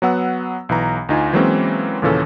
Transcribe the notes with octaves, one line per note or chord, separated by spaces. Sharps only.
F#3 B3 F#5 E6
B1 E3 A#5
D2 D#4 F4 G#5
E3 F#3 G#3 A#3 C4 C#4
D#2 A#2 C#3 E3 C#4 A4